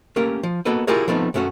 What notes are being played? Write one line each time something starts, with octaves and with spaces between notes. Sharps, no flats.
A3 A#3 C#4 G4 A#4
F3
A#3 B3 F#4 A4 B4 D#5
E4 F4 G4 G#4 A#4 C#5
F3 A3 B3 C4 D#4
B1 F#2 A3 C#4 F#4